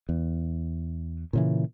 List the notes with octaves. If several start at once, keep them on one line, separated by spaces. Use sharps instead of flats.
E2
A#2 C#3 E3